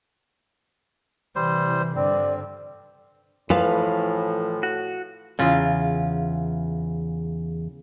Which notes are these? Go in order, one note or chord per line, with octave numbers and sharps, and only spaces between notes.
C3 E3 G3 C5
G2 D3 C4 D5
A2 E3 F3 B4 F5
F#4
E2 G#2 C#3 F4